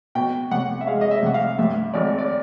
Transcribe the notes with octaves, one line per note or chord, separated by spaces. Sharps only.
B2 G5
C2 F#5
E5
G#3 F5
D#5
E5
C2 F#5
F5
G2 E5
G#1 D5
D5